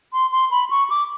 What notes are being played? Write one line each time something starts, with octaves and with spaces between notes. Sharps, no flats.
C6
C6
B5
C#6
D6